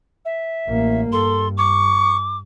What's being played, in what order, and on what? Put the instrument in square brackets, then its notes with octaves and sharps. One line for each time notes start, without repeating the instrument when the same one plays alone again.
[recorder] E5
[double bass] A1 A#3
[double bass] G2 [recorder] A4 [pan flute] C6
[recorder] C#6 [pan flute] D6